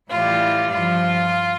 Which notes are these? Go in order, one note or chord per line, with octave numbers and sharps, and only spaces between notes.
A2 E3 G3 F4
G2 F3 F4